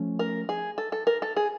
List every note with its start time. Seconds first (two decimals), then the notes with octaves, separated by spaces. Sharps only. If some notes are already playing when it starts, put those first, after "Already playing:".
Already playing: F3 A3 C#4
0.19 A#4
0.49 G#4
0.78 A4
0.92 A4
1.07 A#4
1.22 A4
1.36 G#4